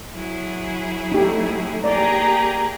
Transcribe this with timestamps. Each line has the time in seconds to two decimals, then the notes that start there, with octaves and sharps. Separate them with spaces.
0.14 F#3 E4 G#4
1.12 A3 D#4 G4
1.84 A#3 G4 G#4 D5 A#5